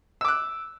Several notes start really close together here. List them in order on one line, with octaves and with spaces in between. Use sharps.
E6 D6 F#6